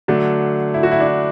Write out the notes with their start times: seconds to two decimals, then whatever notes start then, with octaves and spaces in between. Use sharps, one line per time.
0.08 D3 F#3 A3 D4
0.74 E4
0.83 F#4
0.92 E4
1.00 D4
1.08 E4